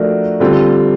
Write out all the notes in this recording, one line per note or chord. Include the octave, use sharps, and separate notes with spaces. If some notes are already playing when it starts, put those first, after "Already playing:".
Already playing: F3 A3 D4 F#4 A#4
D3 G3 C4 F4